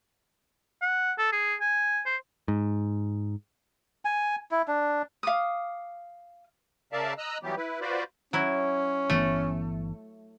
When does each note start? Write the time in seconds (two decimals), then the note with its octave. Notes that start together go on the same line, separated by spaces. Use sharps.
0.82 F#5
1.18 A4
1.32 G#4
1.61 G#5
2.06 C5
2.48 G#2
4.05 G#5
4.51 E4
4.68 D4
5.23 F5 D6 D#6
6.92 C#3 A#4 D5 E5 F5 A5
7.18 D#5 A#5 E6 F#6
7.43 E3 F#3 G3 B3 G4
7.57 E4 B4
7.81 F4 F#4 B4 C5 D5
8.33 F#3 C#4 E4
9.10 G1 E3 A3 B3